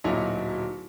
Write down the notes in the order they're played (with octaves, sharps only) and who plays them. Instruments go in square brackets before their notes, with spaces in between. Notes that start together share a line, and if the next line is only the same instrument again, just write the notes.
[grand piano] D1 A#2 F#3 D#4 E4 F7